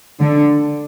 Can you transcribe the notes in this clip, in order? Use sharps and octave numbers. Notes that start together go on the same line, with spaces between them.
D3